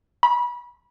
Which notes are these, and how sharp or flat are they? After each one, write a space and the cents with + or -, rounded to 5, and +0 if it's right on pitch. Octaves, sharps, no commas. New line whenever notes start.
B5 -30